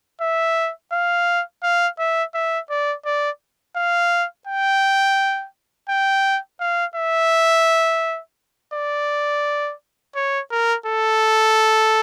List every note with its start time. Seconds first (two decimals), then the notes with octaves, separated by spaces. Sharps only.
0.21 E5
0.92 F5
1.63 F5
1.99 E5
2.35 E5
2.70 D5
3.05 D5
3.76 F5
4.47 G5
5.89 G5
6.60 F5
6.96 E5
8.74 D5
10.16 C#5
10.51 A#4
10.86 A4